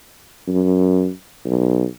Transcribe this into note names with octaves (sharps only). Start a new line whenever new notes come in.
F#2
B1